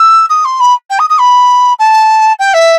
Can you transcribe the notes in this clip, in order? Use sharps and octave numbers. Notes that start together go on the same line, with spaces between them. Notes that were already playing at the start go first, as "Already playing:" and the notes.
Already playing: E6
D#6
C6
B5
G5
D#6
D#6
B5
A5
G5
E5